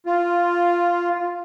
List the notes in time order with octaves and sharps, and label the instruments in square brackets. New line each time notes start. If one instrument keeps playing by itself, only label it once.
[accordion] F4